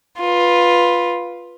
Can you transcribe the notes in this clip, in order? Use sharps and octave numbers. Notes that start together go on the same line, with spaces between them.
F4 B4